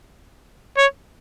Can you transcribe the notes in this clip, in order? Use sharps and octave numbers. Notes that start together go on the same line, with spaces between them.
C#5